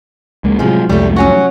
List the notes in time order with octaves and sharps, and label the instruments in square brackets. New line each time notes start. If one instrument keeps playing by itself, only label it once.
[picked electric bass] C#2 G#3 A#3
[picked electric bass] A2 C3 F#3 [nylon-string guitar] F3 G#3
[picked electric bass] C2 F2 G#2 [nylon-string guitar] G3 A3
[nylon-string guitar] F#3 C#4 F#4